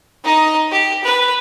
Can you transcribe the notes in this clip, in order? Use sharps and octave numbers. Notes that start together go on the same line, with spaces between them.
D#4 D#5
G4
B4